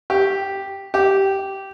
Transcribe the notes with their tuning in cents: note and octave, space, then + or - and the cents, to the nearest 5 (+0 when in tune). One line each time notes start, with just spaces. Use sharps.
G4 +0
G4 -10